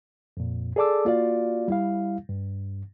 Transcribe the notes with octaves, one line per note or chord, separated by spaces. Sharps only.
F2 A#2
G#4 A4 D5 A5 D6 E6
A#3 F4 F#4 D5 F5
G3 E4 F5
G2